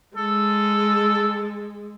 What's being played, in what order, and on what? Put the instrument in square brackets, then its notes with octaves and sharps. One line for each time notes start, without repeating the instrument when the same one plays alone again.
[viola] G#3 [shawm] A4